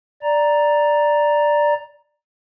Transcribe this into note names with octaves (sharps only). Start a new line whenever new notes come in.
D5 A#5